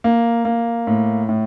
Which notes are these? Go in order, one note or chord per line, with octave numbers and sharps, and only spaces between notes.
A#3
A#3
A2
A2